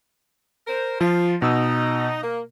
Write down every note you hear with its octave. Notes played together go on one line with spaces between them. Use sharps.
A#4 C5
F3 F4
B2 D#4 E6
A#3